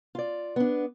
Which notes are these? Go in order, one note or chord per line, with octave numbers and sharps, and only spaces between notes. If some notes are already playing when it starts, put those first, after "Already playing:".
F4 D5
B3 D4